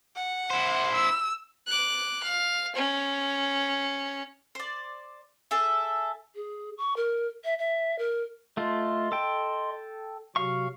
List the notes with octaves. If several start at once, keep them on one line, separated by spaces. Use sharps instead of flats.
F#5
E4 C5
E6
D6 F#6
F5
C#4
C5 D5
E4 G#4 A4 E5
G#4
C#6
A#4
E5
E5
A#4
A3 F4 D#5 C6
A4 G5
C3 F#3 F#4 F5 C#6